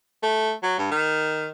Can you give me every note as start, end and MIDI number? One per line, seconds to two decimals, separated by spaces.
0.23 0.52 57
0.63 0.76 54
0.78 0.89 43
0.91 1.48 51